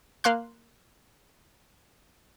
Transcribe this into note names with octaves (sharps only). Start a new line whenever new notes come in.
A#3 F5 C6 F#6